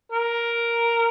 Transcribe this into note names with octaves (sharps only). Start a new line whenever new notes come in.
A#4